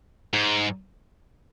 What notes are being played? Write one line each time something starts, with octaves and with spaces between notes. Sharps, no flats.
G#2